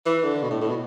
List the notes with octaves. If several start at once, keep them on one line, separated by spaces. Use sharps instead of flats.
E3
D3
B2
A2
A2
B2